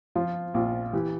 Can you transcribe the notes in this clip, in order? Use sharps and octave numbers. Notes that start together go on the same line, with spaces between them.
F3 F4
A#1 F4
E3 G4